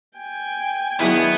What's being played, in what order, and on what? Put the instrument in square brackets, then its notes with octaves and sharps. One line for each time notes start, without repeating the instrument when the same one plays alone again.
[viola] G5 G#5
[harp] D#3 F#3 D4 [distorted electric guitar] B3 [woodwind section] E4 G#4